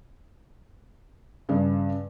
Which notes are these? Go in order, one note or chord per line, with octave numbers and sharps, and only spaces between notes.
G2 C#3